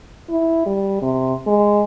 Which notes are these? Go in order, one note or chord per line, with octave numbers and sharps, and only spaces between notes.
E4
G3
C3
G#3